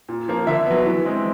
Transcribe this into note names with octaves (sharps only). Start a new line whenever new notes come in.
A#2
F3 A#3
D3 E5
F#3 B3
E3
G#3 C4